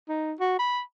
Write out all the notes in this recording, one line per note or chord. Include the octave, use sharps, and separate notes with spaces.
D#4
F#4
B5